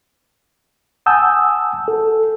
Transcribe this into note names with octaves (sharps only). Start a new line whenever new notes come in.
F#5 G#5 A5 D#6 E6 G6
A4